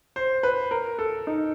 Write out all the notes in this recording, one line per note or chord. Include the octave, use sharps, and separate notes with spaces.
C5
B4
A#4
A4
D#4